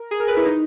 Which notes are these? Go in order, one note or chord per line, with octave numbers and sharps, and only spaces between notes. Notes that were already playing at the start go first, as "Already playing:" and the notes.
Already playing: A#4
G#4
A#4
B4
E4
D#4